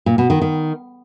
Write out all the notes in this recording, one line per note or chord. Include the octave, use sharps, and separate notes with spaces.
A#2
B2
D#3
D#3